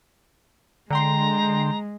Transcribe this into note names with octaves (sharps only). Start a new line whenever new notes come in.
D3 G#3 G5 A#5 C6